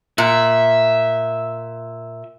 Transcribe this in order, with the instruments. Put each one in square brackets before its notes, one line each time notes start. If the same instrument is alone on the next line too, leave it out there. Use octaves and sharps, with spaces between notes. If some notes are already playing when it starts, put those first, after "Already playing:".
[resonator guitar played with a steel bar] A#2 [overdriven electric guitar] E5